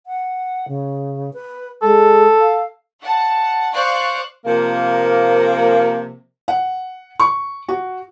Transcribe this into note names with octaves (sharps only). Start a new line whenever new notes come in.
F#5
C#3
B4
G#3 A4
F5
F#5 A5
C5 D5 F5 C#6 F#6
C3 F3 A#3
F#5
C#6
F#4